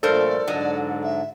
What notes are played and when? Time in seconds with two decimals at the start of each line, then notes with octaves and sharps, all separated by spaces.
0.03 G2 A#2 F3 A3 A4 A#4 C5 D5
0.48 G#2 D3 F#3 D4 D#5
1.04 E5